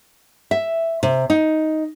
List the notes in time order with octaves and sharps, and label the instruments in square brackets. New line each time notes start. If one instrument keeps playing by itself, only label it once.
[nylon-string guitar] E5
C3
D#4